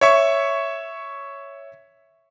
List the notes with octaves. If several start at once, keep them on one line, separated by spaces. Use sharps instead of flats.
C#5 E5 C#6